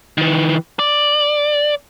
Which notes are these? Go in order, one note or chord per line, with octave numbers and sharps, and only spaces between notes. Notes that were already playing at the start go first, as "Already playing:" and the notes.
D#3 E3
D5